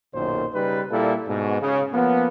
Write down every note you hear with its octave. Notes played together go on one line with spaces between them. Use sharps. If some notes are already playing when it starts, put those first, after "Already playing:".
B1 F#2 A#2 D#3 C5
C#3 G3 D#4 B4
A#2 G3 A#3 E4 A4
G#2 B2
C#3
F3 A#3 B3